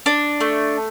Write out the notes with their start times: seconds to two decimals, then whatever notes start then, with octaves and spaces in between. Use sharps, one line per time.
0.06 D4
0.41 A3